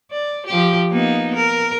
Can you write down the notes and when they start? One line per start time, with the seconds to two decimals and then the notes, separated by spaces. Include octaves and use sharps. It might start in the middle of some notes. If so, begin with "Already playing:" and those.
0.11 D5
0.47 F3 G4
0.90 A#3 B3 D#4
1.36 A#4